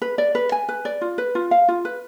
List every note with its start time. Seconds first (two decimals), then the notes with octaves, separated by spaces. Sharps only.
0.02 B4
0.18 D5
0.35 B4
0.52 G#5
0.69 B4
0.85 D5
1.01 F4
1.18 B4
1.35 F4
1.51 F5
1.68 F4
1.85 B4